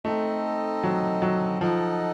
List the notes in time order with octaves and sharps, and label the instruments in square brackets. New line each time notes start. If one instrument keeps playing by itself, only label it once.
[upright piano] A3 [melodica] C4 D#4 A4 D#5
[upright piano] F#3
F#3
[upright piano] F3 [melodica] D#4 A4 D#5 F#5